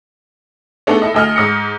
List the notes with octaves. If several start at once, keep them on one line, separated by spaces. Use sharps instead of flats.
A3 B3 D4 D#4 G#4 A4
E4 A4 D#5
D2 A4 D#5 G#5 F6
G#2 D#6 A#6 C#7